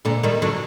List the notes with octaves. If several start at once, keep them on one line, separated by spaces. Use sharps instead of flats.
A#2 D3
D#3 G3
D3 F#3